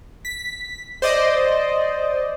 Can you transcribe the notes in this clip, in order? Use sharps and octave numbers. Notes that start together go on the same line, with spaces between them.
B6
C5 D5 D#5